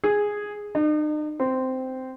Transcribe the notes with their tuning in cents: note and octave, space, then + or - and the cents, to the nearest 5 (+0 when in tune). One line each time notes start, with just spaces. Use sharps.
G#4 -5
D#4 -45
C4 -10